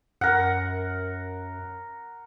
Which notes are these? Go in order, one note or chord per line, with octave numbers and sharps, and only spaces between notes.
F#2 A#4 F#5